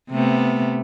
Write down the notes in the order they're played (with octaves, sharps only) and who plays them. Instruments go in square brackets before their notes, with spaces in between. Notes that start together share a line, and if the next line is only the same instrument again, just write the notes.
[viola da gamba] C3 A3 B3